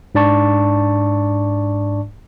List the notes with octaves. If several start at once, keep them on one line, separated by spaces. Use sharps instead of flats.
G#2 D4 D5 A5 C#6